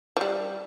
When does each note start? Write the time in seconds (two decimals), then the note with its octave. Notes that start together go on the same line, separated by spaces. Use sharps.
0.17 F3
0.21 G3